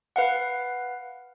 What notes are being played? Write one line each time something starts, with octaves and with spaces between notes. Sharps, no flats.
B4 F5 F#5